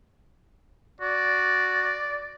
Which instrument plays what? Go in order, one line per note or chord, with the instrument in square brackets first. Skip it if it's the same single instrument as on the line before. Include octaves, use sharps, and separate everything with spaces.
[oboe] F#4 [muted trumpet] D5